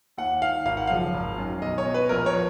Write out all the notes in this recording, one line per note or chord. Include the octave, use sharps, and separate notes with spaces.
D#2 F#5
D#3 F5
G#1 F5
F#5
F#2 C#3 F3 F5
G#1
F#2 D#3
B1 D#5
C#5
B2
B4
A#1 A#4
C#5
F3